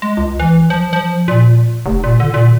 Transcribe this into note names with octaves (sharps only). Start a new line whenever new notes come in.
G#3
C#2
E3
F3
F3
A#2
F1
A#2
D3
A#2